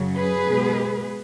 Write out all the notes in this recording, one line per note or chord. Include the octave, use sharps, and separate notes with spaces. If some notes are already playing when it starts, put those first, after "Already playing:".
Already playing: F#2 C#3 F#3
G#4 B4
B2 G#3